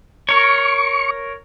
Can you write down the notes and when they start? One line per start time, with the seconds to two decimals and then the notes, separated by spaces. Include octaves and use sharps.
0.29 A#4 C#5 C#6